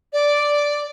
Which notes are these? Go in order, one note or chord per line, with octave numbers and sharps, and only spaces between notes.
D5